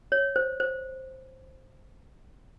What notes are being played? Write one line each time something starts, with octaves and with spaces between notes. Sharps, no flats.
C#5
C5
C5